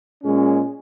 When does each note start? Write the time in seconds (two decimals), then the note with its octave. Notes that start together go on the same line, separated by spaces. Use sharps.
0.24 A#2 G#3 C#4